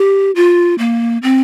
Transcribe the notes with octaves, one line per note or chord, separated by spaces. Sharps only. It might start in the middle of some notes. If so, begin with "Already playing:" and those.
Already playing: G4
F4
A#3
C4